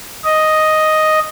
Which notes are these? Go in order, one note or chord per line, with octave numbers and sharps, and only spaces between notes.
D#5